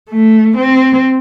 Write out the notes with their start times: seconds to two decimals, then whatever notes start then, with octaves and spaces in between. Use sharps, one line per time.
0.10 A3
0.57 C4